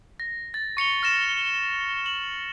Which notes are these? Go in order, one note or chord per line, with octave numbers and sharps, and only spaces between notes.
A#6
A6
C#6 C#7 F7 G7
F6 A#6 E7
F#7